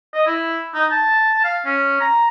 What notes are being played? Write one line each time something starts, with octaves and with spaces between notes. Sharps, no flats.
D#5
E4
D#4
A5
F5
C#4
A#5